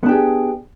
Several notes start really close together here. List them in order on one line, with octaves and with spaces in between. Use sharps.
B3 D4 G4 G#4